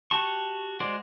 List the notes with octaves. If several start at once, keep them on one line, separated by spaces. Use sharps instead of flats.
F#4 G4 A5 C#6
G#3 F#4 C5 D5